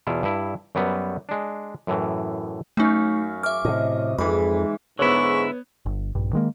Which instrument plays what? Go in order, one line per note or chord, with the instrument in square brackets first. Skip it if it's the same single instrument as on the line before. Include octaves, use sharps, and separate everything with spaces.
[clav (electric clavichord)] E2 B2 E4 F4
G2 E4
F#2 F#3 G3 B3
G#3 D4
F#2 A2 E3
[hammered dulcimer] F#2 C#4 F5 [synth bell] A3 D#4
[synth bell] E5 F6 [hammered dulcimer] D6
[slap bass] A2 C3 [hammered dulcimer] D#5
[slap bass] F2 [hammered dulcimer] G#2 E3 [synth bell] B5
[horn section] G#2 [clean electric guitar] D3 E4 [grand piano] B3 C#5 [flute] C#6
[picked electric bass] G1
A#1 G2
D#3 G#3 A#3